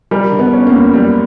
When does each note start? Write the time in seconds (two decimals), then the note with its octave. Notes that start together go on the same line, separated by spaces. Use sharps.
0.11 G3 A#4
0.32 D3
0.39 B3
0.53 C#4
0.67 A#3
0.74 F#2
0.94 G3